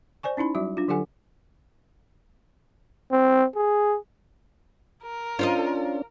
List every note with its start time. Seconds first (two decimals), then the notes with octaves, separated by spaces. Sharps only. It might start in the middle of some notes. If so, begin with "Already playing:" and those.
0.23 C5 D5 G#5 C#6
0.37 C#4 D#4 E4 B5
0.55 F#3 G3 F#4 E5
0.77 D4 F4
0.88 D3 F#3 G4 A4 F#5 G#5
3.11 C4
3.56 G#4
5.04 A#4
5.39 C#4 D4 F4 C5 D#5